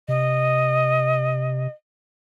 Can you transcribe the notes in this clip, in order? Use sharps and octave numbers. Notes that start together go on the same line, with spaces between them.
C3 D#5